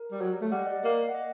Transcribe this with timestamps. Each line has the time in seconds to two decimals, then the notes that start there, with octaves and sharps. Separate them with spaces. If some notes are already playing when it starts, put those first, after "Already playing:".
Already playing: A#4
0.12 G3
0.21 F#3
0.41 A3
0.51 G3 F#5
0.59 D#5
0.66 D5
0.73 D#5
0.84 A#3
1.09 F#5
1.15 D#5